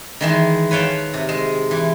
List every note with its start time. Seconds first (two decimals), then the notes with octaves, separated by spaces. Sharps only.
0.21 D#3 E3 G#3
0.71 B4 C#5 F5 G5 A5
1.13 C3
1.29 G#3
1.71 E3